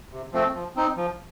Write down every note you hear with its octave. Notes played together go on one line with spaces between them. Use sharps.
C3
F3 A3 C4
F3
C4 D#4
F3